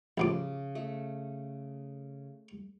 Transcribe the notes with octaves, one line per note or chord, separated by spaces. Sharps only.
A1 C#3 F3 D6
A3